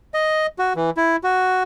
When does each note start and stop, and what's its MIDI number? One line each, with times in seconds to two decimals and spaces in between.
0.14 0.47 75
0.59 0.73 66
0.76 0.90 52
0.97 1.16 64
1.24 1.63 66